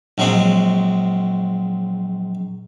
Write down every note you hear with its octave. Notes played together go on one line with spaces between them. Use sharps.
A#1 F#3 G#3 C4